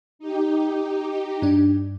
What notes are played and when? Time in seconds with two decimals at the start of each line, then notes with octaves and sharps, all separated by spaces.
0.19 D#4 G4
1.42 G2 D4